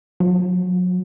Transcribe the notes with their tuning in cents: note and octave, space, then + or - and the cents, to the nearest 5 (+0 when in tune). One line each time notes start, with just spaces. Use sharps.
F#3 -30